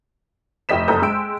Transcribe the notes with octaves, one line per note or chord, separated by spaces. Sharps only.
F1 A3 G4 D#5 B6 E7
F#1 A4 A#5 D#6 G6
G#3 G5 E6 D7